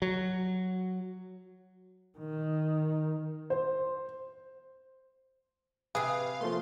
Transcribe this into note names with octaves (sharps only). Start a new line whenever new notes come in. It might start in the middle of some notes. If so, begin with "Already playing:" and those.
F#3
D#3
C5
C3 G#4 B4 F5
F3 A3 A#3 C6